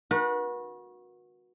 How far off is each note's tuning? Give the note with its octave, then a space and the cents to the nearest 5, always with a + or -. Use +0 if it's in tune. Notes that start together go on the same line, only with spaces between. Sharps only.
F#4 -20 B4 -40